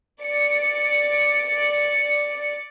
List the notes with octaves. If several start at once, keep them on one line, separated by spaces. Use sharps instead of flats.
D5 C#7